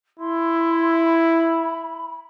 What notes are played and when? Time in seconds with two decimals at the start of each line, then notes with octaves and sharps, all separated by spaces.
0.19 E4 C6
1.02 B5